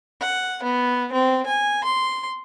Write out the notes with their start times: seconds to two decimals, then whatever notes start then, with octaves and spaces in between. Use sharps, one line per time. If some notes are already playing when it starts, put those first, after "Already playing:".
0.20 F#5
0.63 B3
1.13 C4
1.46 G#5
1.84 C6